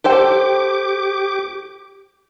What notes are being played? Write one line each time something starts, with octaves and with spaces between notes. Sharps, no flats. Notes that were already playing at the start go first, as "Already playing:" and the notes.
G4 A4 C5 G5 D6